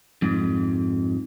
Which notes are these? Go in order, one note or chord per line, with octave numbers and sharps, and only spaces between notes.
F2 G#2